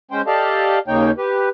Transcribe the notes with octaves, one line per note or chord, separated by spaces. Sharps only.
G#3 C#4 C5 G5
G4 A4 D5 D#5 F5 A5
D#2 C#3 A#3 D#4 C#5 G5
G4 B4